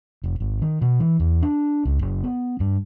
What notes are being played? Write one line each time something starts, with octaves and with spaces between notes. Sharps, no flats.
F1
G#1
D#3
B2
E3
E2
D4
C#2
F#1
B3
G2